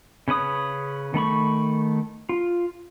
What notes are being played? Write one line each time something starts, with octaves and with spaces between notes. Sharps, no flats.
C#3 C#4 B4 D#6
D#3 A3 B5 C#6
F4